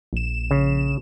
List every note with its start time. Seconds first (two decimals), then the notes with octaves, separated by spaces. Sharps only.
0.13 A#1 E7
0.51 C#3